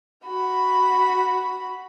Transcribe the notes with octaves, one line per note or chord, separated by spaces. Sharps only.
F#4 B5